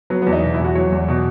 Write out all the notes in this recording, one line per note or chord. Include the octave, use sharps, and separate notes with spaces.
F#3 B3
B3
E2
D#4
B2
E4
E2
F#4
F#3 C#5
E2
B2